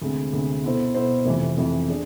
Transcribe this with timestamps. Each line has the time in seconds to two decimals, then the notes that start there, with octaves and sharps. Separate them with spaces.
0.02 D2 C3 G#3 C4
0.32 D2 C3 G#3 C4
0.64 B2 B3 E4 A4 C5
0.94 B2 B3 E4 A4 C5
1.26 F1 F2 C3 E3
1.58 F1 F2 C3 E3
1.88 D4 G#4